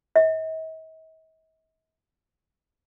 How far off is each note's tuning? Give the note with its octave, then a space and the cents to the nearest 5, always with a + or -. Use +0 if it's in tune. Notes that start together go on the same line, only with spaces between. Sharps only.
D#5 +45